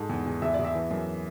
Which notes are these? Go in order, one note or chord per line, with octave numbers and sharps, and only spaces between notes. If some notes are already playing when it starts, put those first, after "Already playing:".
Already playing: G#2 A4
E2
E2
E2 E5
E2 D5
E5
E3
F#2